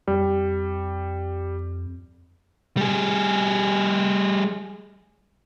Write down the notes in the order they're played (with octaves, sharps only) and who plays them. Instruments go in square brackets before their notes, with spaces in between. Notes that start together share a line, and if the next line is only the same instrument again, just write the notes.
[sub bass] F2 [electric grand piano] G3
[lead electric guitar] G3 G#4